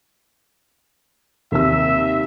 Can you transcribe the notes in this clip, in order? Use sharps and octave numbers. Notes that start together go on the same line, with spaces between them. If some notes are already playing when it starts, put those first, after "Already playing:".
D#2 C3 E5 E6